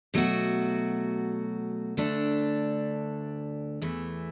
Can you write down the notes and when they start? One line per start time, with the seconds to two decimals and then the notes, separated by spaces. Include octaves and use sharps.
0.14 B2 F#3 A3 F#4
1.97 D2 D3 A3 D4
3.82 E2 E3 A3